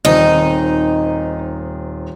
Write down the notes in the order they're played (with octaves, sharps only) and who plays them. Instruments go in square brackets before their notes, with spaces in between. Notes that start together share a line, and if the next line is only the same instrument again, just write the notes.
[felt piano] D#1 D#3 C4 [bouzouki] D#4